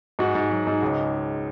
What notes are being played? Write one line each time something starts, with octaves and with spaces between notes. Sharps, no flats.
G#2 F#4
G#2
F#3
G#2
C#2